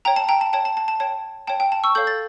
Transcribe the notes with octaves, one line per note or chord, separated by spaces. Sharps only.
C#5 G5 A#5
A5
G5 A#5
A5
C#5 G5 A5
A5
A5
A5
C#5 G5 A5
C#5 G5 A5
G5
A5
C#6 E6
A4 C#5 F5 G6
A6